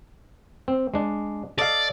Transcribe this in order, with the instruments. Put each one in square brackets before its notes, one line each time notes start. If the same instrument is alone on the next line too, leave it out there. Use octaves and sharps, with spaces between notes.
[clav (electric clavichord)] C4
G#3 D4
[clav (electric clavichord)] A4 D#5 F5 [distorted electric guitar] D5